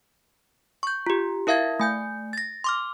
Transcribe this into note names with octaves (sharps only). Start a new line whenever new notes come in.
C#6 G6
F4 G4
E4 A#4 E5 F5 G#6
A3 G#5 G6
A6 A#6
C6 D6 F6